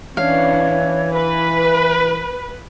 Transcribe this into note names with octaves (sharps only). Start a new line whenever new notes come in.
E3 C#4 D4 C#5 F5
B4 B5